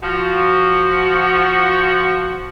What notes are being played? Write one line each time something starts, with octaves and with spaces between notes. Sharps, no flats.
F3 F#4